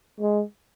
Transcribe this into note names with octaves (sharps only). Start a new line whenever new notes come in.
G#3